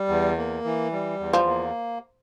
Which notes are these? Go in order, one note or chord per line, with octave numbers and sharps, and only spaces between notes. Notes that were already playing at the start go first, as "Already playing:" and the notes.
Already playing: G3
E2
A#3
E3
G3
E2
F3
A#3